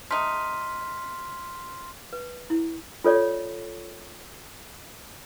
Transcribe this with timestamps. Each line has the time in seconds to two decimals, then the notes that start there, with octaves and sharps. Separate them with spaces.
0.10 A3 D#4 C6 F6 B6
2.13 B4
2.50 E4
3.04 F4 A4 C#5 D5